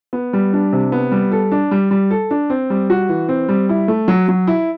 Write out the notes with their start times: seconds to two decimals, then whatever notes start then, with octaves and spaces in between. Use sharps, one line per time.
0.13 B3
0.33 G3
0.53 D4
0.73 C3
0.92 B3
1.12 G3
1.32 A4
1.52 D4
1.71 G3
1.91 G3
2.11 A4
2.31 D4
2.50 C4
2.70 G3
2.90 F#4
3.09 E3
3.29 C4
3.49 G3
3.69 E4
3.88 A3
4.08 F#3
4.29 F#3
4.47 E4